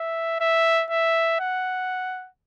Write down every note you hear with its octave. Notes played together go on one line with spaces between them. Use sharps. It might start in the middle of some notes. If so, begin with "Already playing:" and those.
Already playing: E5
E5
E5
F#5